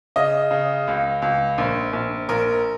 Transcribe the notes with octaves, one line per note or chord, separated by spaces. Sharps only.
C#3 D#5
C#3
C#2
C#2
A#1
A#1
A#1 A#4